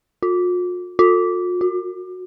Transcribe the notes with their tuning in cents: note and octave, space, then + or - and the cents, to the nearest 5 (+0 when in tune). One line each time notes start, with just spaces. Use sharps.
F4 +45
F4 +45
F#4 -15